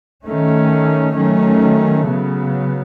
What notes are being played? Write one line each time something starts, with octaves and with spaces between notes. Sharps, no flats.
D#3 A3 C#4
D#3 F#3 A3 C#4
C#3 F#3 B3